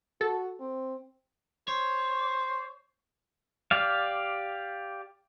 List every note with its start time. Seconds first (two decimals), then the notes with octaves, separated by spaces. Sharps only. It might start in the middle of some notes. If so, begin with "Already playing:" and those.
0.21 F#4 A4
0.60 C4
1.68 C5 C#5
3.71 G4 D5 F5